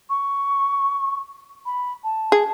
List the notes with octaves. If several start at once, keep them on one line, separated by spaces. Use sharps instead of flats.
C#6
B5
A5
G#4